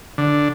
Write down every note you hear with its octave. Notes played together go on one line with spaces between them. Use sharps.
D3